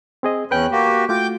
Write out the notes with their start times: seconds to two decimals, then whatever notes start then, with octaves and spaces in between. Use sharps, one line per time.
0.23 C4 G#4 D#5
0.51 E2 C#4 B4 G5 F#6
0.72 A#3 F#4 G4
1.09 A3 F4 F#4 G5 D6 G6